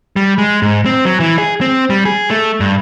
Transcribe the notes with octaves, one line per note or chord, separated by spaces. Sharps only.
G3
G#3
G#2
C4
F#3
E3
G#4
C4
G3
G#4
A3
G2